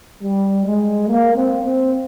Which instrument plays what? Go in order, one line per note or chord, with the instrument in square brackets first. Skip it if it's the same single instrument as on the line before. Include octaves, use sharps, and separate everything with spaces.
[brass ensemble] G3
G#3
A#3
C4
C4